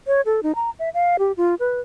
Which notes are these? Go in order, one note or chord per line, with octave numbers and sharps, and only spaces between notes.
C#5
A4
D#4
A#5
E5
F5
G4
F4
B4